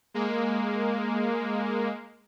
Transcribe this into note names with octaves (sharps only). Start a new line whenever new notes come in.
G#3 A#3